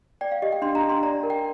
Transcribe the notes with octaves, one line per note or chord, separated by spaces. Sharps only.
D5 G5
F5
G4 D#5
G5
D4 C6
A#5
D4
C6
D5 A#5
A#4
G5